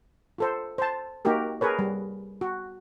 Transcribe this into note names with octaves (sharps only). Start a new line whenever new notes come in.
F4 A4 C5
C5 A5
A#3 D#4 F#4 G4 A#4
G#4 A#4 B4 C#5
G3
F#4